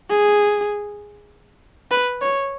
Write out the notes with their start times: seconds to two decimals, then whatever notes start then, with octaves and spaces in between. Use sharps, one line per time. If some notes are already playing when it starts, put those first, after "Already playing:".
0.10 G#4
1.91 B4
2.22 C#5